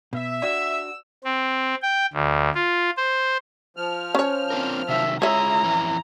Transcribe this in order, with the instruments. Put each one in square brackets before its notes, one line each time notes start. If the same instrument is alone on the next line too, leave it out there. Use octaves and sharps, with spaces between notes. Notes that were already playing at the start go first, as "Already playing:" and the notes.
[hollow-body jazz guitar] B2 [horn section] E5
[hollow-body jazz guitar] D4 F#4 [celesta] D5 F#5 [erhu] E6
[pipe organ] C4
G5
D2
F4
C5
[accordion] F3 F6
[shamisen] C#4 C#5
[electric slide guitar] C4 D4 A#4
[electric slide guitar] C3 D#3 F#3 [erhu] E5
[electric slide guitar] G#3 F4 G#4 [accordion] E4 [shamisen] C#5 E5 [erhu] A#5
[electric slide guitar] F2 E3 C#4